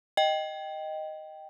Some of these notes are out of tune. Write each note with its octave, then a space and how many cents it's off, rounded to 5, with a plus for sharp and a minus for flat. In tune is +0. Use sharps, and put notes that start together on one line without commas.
D#5 +0 G5 -5